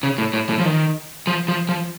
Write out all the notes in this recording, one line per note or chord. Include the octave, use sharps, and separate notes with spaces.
C#3
A2
A2
A2
F3
D#3
F3
F3
F3